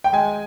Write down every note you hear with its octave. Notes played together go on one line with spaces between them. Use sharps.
G5
G#3 G#5